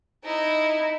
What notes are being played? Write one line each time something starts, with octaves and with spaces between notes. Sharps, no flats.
D#4 E4